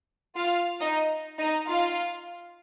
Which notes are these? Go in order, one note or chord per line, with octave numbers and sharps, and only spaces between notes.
F4 F5
D#4 D#5
D#4 D#5
F4 F5